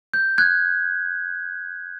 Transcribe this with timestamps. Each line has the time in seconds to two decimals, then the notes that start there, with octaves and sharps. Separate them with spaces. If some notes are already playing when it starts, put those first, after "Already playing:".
0.14 G6
0.38 F#6 G#6